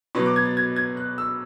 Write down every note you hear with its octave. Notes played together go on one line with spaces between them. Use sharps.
B2 F#3 B3 C#6
D6
G#6
A6
G#6
G#6
F#6
E6